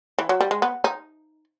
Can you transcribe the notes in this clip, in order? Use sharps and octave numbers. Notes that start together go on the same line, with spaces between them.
E3
F#3
G3
G#3
B3
D#4